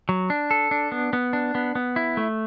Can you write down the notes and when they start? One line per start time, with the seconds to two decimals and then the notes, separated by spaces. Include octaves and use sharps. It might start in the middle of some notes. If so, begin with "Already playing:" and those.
0.09 F#3
0.30 D4
0.51 A4
0.71 D4
0.92 B3
1.13 B3
1.33 D4
1.55 B3
1.75 B3
1.96 E4
2.17 A3